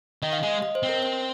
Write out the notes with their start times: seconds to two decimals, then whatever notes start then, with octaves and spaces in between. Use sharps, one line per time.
0.22 D#3 D#5
0.33 F5
0.43 G#3 D#5
0.62 D#5
0.75 C5
0.83 C4
0.89 A#4
1.03 C5